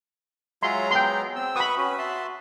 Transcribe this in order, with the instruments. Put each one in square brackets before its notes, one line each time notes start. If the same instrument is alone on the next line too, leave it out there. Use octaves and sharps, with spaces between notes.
[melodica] F#3 G#3 A#5 [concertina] F4 C#5 E5 [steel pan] C6
[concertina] B3 [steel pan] G5 C6
[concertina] C4 E6
[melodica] F#4 B4 C#6 [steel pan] B5 D#6
[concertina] C#4 B4 [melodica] F#4
[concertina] E5 A5 C6